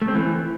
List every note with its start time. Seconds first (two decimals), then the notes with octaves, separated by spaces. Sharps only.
0.02 A3
0.08 C4
0.15 E3